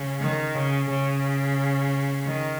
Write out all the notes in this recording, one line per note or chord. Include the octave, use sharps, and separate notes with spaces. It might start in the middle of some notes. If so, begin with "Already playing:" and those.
Already playing: C#3
D#3
C#3
C#3
D#3